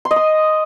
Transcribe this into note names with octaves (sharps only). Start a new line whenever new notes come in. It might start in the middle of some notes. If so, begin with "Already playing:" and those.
C6
D#5
D#6